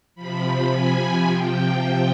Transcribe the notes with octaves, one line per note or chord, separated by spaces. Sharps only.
C3 F3 B5
G#5
C3 F3 G5